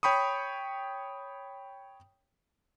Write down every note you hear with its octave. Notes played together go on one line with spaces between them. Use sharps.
C#5 G5 B5 C#6 D#6